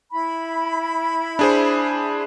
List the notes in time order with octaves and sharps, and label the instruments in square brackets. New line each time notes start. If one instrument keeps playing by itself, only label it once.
[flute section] E4 B5
[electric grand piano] D4 G#4 C5